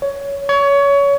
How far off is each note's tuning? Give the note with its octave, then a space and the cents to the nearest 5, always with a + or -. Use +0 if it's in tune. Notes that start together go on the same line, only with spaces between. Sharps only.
C#5 +15
C#5 +25